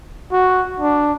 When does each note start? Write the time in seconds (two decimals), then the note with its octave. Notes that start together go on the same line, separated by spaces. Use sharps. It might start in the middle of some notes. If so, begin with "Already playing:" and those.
0.32 F#4
0.80 D4